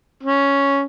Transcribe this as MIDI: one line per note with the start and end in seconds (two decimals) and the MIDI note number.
0.23 0.84 61